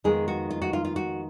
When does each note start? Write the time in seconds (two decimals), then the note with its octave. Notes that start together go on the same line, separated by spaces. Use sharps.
0.04 F2 D#3 G#3 B3 G#4
0.28 F#4
0.50 F4
0.62 F#4
0.73 F4
0.85 F4
0.96 F#4